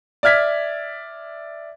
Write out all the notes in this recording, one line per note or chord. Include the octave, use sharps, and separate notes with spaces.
D5 E5 F6 G#6 B6